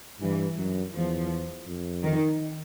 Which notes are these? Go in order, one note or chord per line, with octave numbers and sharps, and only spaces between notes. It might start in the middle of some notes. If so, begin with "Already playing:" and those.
G2 E3
F#2 F#3
E2 F3
F2
D#3